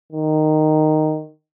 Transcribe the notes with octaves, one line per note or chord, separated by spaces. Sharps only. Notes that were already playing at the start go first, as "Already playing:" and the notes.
D#3